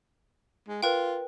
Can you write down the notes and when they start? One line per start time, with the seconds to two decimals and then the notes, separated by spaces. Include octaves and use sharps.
0.68 G#3
0.83 F4 A#4 B4 G5